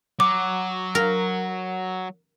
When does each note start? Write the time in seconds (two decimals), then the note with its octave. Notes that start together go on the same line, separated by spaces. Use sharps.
0.20 F#3 D6
0.95 A#4